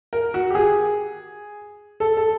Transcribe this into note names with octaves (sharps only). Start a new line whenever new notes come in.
A#4
F#4
G4
G#4
A4
A4